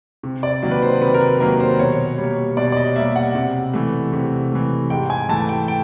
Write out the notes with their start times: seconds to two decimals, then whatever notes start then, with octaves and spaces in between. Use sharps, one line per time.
0.23 C3
0.43 D5
0.62 D#3 F#3 A#3
0.71 B4
0.82 C5
1.02 C3 B4
1.14 A#4
1.21 B4
1.40 D#3 F#3 A#3 A#4
1.60 C5
1.79 B2 C#5
2.18 G3 A#3
2.57 B2 D5
2.72 D5
2.77 D#5
2.96 G3 A#3 E5
3.16 F#5
3.35 C3
3.74 E3 A3
4.13 C3
4.52 E3 A3
4.90 G#2 G5
5.10 G#5
5.29 E3 A3 A5
5.49 G5
5.68 G5